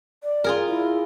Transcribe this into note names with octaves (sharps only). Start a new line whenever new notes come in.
D5
F4 G#4 A#4
E4